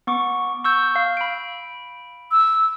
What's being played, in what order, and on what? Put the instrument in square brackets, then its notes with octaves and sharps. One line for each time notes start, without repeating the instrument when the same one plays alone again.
[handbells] B3 C#6 D6
C#6 E6 G6
F5
B5 D7
[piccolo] E6